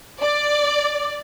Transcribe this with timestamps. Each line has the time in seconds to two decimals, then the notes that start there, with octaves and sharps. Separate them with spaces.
0.21 D5